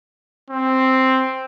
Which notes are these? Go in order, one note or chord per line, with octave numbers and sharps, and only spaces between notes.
C4